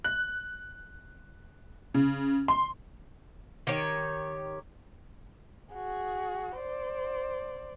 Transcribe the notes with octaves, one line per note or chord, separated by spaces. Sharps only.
F#6
C#3
C6
D#3 G4 C#5
F#4 G#4
C5 D5